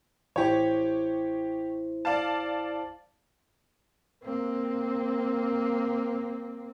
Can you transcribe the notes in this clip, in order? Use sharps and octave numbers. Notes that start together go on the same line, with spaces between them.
A1 E4 G4 C5 C#5
D5 F5 A5
A#3 C4